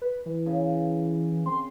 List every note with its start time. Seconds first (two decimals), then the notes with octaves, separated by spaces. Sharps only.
0.02 B4
0.26 E3
0.46 C#3
1.46 C4 C6